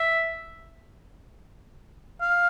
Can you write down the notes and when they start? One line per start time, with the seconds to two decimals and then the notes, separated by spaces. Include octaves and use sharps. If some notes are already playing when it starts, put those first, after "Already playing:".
Already playing: E5
2.21 F5